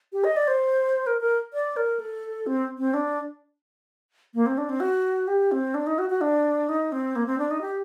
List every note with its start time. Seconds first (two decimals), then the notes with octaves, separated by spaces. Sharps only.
0.13 G4
0.24 D#5
0.36 D5
0.48 C5
1.07 A#4
1.21 A#4
1.53 D5
1.77 A#4
1.99 A4
2.47 C4
2.78 C4
2.94 D4
4.34 A#3
4.46 C4
4.58 D4
4.69 C4
4.80 F#4
5.28 G4
5.52 C4
5.74 D4
5.87 D#4
5.99 F#4
6.10 F#4
6.21 D4
6.69 D#4
6.92 C4
7.16 A#3
7.26 C4
7.38 D4
7.51 D#4
7.61 G4